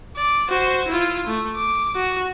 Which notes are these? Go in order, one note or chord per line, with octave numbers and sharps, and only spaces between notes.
D5
F#4 C5
E4 F4
A3
D6
F#4